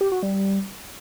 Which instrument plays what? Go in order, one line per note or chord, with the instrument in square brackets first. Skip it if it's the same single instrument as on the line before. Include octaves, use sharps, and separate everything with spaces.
[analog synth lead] G4
F#4
G3